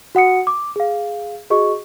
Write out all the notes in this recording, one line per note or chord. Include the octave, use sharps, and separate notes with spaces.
F#4 F#5 D#6 C#7
D6
G#4 F5
F#4 G#4 D#5 C#6